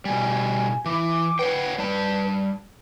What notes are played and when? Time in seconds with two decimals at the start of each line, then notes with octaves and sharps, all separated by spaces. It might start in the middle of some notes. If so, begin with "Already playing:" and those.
0.05 B2 G3 G#5
0.86 E3 D6
1.39 B4 C#5 F#5 G5
1.78 G3 A5